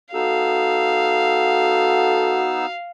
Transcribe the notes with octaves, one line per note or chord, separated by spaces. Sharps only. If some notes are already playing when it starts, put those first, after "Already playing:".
B3 D#4 F#4 A4 F5 E6